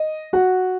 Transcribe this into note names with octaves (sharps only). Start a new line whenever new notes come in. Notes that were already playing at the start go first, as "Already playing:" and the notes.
Already playing: D#5
F#4 F#5